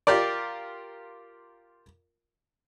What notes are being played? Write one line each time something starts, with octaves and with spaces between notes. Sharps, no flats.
F4 G4 A#4 D5